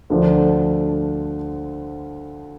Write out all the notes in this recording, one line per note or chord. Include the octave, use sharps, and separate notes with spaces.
D2 D3 F3 D4